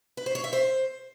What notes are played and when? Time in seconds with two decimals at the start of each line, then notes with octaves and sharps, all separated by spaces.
0.17 B4
0.26 C5
0.35 C#5
0.44 E5
0.53 C5